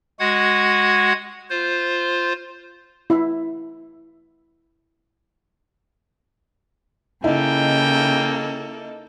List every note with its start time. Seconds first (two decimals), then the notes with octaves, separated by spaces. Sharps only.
0.20 G#3 F#4 F#5 G#6
1.50 F4 C5
3.10 E4 E5
7.24 C#3 A#3 D#4 E4 A4 G5